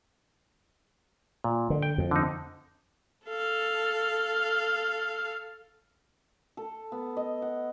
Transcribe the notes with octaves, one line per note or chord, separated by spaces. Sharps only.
A#2
D3
G5
F2
D3 D#4
A4 F5
A4
B3
D#5
F#5